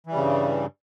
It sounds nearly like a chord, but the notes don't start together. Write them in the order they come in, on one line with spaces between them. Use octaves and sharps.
E3 G3 C#3 G2